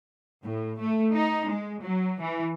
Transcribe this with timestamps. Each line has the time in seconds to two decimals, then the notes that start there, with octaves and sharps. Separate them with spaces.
0.42 A2
0.78 A3
1.14 D#4
1.50 G#3
1.83 F#3
2.22 E3